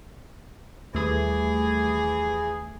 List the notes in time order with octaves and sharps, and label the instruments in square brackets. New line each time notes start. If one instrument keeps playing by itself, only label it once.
[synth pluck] D#2 G3 A3 [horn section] E3 G#4